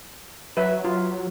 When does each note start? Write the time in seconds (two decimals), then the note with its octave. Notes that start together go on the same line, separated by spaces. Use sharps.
0.57 F#3 B4 E5
0.85 F4